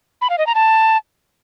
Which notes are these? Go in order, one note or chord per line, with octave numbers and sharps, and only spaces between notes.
B5
F5
D#5
A#5
A5